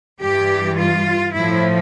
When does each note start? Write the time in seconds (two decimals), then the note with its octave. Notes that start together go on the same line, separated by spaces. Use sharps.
0.22 G2 E3 G4
0.78 F4
1.34 A2 F3 E4